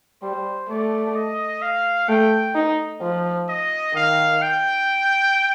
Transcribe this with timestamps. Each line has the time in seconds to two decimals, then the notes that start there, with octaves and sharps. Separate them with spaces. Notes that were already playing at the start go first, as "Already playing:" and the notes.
0.22 G3 C5
0.69 A3 D5
1.15 D#5
1.62 F5
2.09 A3 G5
2.55 D#4
3.02 F3
3.49 D#5
3.94 D#3 F5
4.42 G5